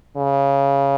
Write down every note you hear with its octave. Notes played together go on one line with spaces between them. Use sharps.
C#3